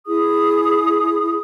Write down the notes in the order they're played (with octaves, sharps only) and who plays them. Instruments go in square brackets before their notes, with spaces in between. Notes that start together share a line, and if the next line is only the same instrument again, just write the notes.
[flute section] E4 G#4 D#6